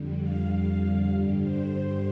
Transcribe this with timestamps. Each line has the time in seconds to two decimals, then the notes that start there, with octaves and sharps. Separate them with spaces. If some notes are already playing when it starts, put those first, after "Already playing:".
Already playing: F2 D3 G3
0.21 F5
1.12 G2 D3 G3
1.42 C5